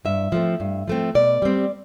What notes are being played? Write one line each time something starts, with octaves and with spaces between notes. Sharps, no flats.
G2 E5
F3 A3 C4
G2
F3 A3 C4
B2 D5
G3 C4